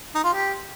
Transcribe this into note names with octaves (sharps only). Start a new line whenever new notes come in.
D#4
F4
G4